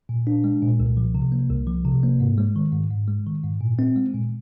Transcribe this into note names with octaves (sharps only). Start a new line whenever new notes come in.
A#2
D4
G#3
A#2
C2
F3
C3
A#3
C2
F3
C3
A#3
G#2
G#3
D#3
G#2
G#2
G#3
D#3
G#2
A#2
C4
G#3
A#2